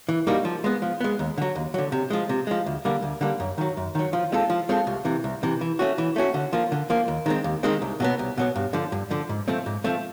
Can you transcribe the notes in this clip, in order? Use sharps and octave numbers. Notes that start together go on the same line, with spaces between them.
E3
G3 A#3 D#4 F#4
F3
G#3 B3
F3
G#3 B3
D#2
D3 F#3
D#2
D3 F#3
C3
F3 G#3
C3
F3 G#3
D2
D3 G3 A#3
D2
D3 G3 A#3
F#2
D#3 F#3
F#2
D#3 F#3
F3
G#3 C4 F4 A4
F3
G#3 C4 F4 A4
C2
C3 E3
C2
C3 E3
E3
A3 C#4 F#4
E3
A3 C#4 F#4
D3
F3 A#3
D3
F3 A#3
D#2
D#3 G#3 C4
D#2
D#3 G#3 C4
C2
B2 F#3 B3
C2
B2 F#3 B3
G2
D3 F3
G2
D3 F3
G#2
F3 A3 C4
G#2
F3 A3 C4